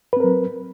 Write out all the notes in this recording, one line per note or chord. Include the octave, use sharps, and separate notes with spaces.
F#3 C4 A#4 B4